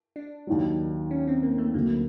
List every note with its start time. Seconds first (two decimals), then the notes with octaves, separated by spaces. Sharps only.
0.16 D4
0.47 D#2 D#3 F#3
1.11 C#4
1.27 C4
1.43 A#3
1.58 A3
1.74 D2 D3 F#3 A#3